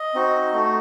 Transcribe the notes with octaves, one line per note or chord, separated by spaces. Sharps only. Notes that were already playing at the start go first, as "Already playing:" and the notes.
Already playing: D#5
C4 D#4 F#4
A3 D#4 F#4